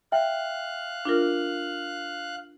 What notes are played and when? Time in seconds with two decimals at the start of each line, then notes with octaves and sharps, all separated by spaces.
0.12 E5 F5 G5 F#6
1.05 D4 F4 A#4